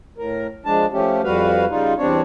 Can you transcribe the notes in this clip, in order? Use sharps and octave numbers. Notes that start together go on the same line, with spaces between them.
A2 A#4
F3 G#3 D4 A5
F3 A3 C#4 G4
F2 G3 F#4 B4 F5
C#3 G3 D#4 F4
E2 G3 C4 D4 C#5